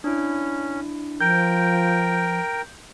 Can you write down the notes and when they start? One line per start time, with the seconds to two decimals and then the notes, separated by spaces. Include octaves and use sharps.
0.04 C#4 D4 E4
1.21 F3 A#4 G5 G6